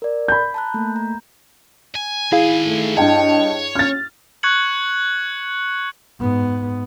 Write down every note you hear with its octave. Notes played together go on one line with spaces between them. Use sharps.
A#4 D5
B5 G6
A5 A#5 F#6
A3 A#3
A#5
G#5
D#3 E4 G#4 F5 G#5
A3
G2 C#5 D#5 G5 A5
C#4 F6 A6
C#6 F#6 G#6 C#7 F#7
G#2 B3